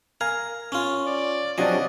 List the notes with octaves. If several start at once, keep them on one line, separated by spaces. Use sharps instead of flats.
A#4 F5 G#5 A#5
C#4 F4
D5
C3 F3 F#3 C#4 D4 D#5 G#5